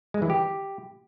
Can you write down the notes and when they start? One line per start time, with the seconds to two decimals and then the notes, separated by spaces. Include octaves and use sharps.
0.14 G#3
0.22 E3
0.30 G4